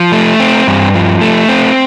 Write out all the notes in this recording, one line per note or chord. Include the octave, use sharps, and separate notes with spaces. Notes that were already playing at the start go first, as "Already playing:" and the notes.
Already playing: F3
A3
C4
G2
F3
A3
C4